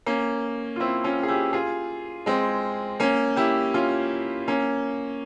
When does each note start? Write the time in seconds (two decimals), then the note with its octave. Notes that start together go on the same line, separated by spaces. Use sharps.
0.06 A#3 C#4
0.76 F4
0.80 C4 E4
1.04 C#4 F4
1.23 G#4
1.28 E4 G4
1.53 F4 G#4
2.26 G#3 C4
3.00 A#3 C#4
3.36 E4 G4
3.74 C#4 F4
4.48 A#3 C#4